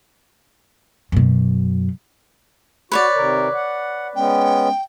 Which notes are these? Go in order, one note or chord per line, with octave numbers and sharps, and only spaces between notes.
F#2 B2
F#4 B4 C#5 D5
C3 D#3 A#4
F#5
G#3 B3 C#4 G5